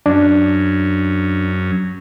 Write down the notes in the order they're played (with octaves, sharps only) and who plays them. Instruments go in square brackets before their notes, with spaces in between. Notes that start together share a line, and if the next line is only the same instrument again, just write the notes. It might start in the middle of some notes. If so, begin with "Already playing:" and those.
[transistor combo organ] F#2 [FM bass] D4